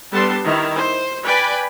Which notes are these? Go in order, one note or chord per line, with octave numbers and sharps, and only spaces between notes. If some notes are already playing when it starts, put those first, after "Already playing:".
G3 B3 D4 A4 A5 C6
D#3 E4
C5
B4 D5 G5 G#5 B5